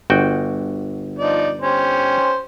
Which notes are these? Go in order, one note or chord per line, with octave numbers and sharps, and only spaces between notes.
G1 F#4 G5
F3 D#4 D5
C#4 G4 C5